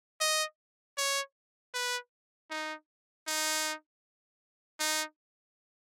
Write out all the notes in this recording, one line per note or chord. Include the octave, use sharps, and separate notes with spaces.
D#5
C#5
B4
D#4
D#4
D#4